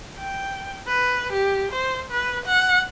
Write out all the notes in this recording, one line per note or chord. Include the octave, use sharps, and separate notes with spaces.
G5
B4
G4
C5
B4
F#5